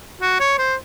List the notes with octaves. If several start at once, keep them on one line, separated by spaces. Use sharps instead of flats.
F#4
C#5
C5